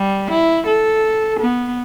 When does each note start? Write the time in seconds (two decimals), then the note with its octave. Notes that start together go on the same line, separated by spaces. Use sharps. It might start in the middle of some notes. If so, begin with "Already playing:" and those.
Already playing: G3
0.31 E4
0.67 A4
1.40 B3